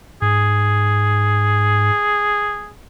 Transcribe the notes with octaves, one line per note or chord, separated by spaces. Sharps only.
G#2 G#4